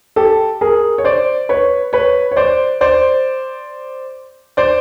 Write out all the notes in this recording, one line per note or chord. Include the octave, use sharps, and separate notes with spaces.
G4 A4
G#4 A#4
C#5
C5 D5
B4 C#5
B4 C#5
C#5
C5 D5
C5 D5
C5 D5